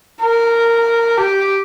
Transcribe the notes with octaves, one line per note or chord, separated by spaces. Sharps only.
A#4
G4